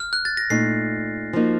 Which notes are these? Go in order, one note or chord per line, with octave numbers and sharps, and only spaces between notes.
F6
F#6
A6
A#6
A#2 A3 D#4 C7
F3 A#3 D#4 F#4